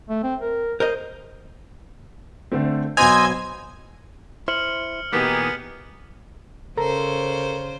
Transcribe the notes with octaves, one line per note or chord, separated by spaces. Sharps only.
A3
C4
A#4
A#4 C5 D#5
D3 A3 C4
B1 B3 C5 D#5 G#5 E6 G#6 F7
E4 C5 F6 C#7 F#7
B2 E3 A#3 B3 D#4 G4 G#4
C#3 A4 A#4 C5 A#5